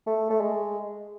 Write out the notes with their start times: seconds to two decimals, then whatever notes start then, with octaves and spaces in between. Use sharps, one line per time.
0.06 A3
0.30 A3
0.41 G#3